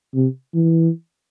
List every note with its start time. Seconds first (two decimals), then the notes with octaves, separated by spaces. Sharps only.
0.15 C3
0.54 E3